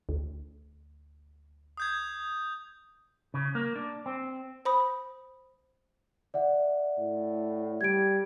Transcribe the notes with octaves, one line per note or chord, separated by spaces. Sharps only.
D2
D#6 G6 G#6
C#3
A#3
D4
C4
C5 B5 D#6
D5 E5 F#5
A2
G3 G#6 D7